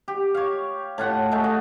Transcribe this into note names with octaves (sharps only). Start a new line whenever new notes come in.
G4
C#5 F5
A2 F4 F#5
G#3 A3
F#4 D#5